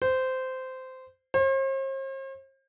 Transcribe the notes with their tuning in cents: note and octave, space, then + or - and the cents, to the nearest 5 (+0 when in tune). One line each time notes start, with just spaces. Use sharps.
C5 -15
C5 +45